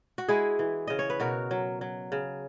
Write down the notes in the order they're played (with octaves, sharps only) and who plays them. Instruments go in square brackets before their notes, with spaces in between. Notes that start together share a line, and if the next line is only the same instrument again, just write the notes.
[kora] F#4
G#3 E4 G#4
E3
C#3 D#5
C#5
B4
B2 F#4 A#4
F#3
F#3
C#3